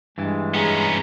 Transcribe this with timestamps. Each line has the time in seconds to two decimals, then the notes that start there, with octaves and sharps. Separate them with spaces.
0.18 G2 E3 G#3
0.54 B3 C#4 G#4 A#5